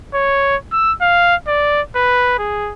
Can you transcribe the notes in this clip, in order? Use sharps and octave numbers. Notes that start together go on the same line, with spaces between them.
C#5
E6
F5
D5
B4
G#4